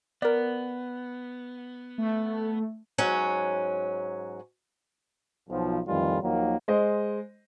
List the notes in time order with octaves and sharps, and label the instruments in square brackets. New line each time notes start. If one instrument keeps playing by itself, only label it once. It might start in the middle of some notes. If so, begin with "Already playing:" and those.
[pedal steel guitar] B3 [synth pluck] A#4 D5
[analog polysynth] A3
[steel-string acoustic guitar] G#2 F#3 C#4
[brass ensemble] B1 F3
F2 A2 D#3 E3 G3 F4
D#2 D#3 F3 F#3 A#3
[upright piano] G#3 C5 D#5